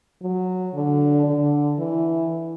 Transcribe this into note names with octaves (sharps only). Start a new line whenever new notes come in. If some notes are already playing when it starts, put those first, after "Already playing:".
F#3
D3
D3
E3